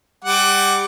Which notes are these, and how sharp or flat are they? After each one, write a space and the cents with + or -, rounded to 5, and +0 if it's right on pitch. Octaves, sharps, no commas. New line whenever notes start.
G3 +20 F#5 +20 D6 +0